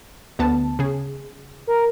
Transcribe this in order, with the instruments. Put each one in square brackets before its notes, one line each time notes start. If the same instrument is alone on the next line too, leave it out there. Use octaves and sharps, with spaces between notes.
[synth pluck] D2 B3 A5
C#3 G#4
[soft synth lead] A#4